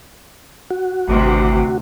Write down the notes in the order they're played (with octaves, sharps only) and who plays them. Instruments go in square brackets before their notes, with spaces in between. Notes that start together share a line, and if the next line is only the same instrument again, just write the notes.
[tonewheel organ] F#4
[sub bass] G#1 [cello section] D2 C3 E3